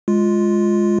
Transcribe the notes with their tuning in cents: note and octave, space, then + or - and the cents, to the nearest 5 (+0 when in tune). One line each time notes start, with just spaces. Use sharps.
G#3 +0 F4 +0